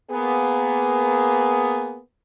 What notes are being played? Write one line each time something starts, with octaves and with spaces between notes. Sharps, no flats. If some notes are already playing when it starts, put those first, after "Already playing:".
A#3 B3 G#4